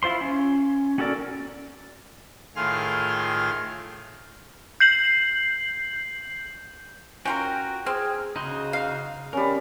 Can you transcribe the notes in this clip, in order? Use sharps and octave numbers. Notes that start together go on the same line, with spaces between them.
E4 F4 C5 C6
C#4
C#4 F#4 A4 A#4 D5
A2 D#3 F4 G#4 C6 F6
G6 C7 F#7
C#4 F4 F#4 A#4 G5
C4 G#4 F6
C#3 D#4 F#4 C6
F5
G3 C4 C#4 A#4